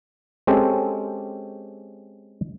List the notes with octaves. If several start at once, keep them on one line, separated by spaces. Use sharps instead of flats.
G#3 C4 C#4 G4 A4